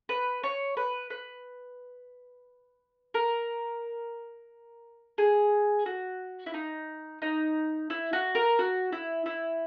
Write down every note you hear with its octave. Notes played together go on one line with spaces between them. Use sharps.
B4
C#5
B4
B4
A#4
G#4
F#4
E4
D#4
D#4
E4
F#4
A#4
F#4
E4
E4